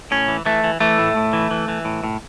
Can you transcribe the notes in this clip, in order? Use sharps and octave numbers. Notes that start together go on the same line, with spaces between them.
A2 C#4
E3
E3 A3
E3
E3 A3
A2
A2
E3
E3
E3
A2
A2